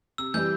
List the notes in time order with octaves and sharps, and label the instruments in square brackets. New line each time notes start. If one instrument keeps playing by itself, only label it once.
[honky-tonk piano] C3 [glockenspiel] E6
[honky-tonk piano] E3 G3 [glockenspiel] G6